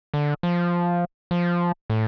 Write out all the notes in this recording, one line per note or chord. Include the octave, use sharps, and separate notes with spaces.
D3
F3
F3
A2